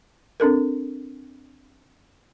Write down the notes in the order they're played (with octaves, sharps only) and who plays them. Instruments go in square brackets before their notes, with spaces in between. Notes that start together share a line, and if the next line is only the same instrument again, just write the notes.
[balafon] C4 D4 A4 A#4